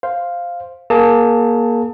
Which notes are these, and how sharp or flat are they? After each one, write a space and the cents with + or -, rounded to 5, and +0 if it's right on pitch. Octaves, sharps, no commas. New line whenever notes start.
C5 +0 F5 +0
A#3 +15 G#4 +35 A5 +35